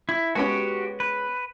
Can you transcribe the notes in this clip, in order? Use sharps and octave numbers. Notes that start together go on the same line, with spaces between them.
E4
G#3 B3 C#4 F#4 G4
B4